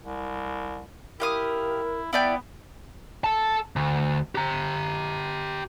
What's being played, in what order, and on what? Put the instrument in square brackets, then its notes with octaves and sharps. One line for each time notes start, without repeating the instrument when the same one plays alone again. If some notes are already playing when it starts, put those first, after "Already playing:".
[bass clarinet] C2
[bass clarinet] E4 [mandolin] G4 F5 D#6 [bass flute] A#4
[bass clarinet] B3 [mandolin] E4 D5 G5
[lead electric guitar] A4 A5
D2
G4 A#5